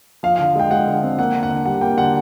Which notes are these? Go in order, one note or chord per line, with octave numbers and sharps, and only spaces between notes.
F3 F5
D3 F5
G#3 G5
G#3 F#5
D3
C4
A#3 F#5
D3
F#5
D3
G3 F#5
A#3 G5
D3 F#5